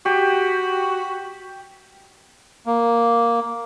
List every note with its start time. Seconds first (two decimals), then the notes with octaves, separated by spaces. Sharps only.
0.06 F#4 G4
2.66 A#3